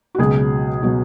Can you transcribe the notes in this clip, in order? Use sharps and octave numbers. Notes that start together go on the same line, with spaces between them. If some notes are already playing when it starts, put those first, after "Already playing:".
F#4
C#2 B2 F#3 G#4
B2 F#3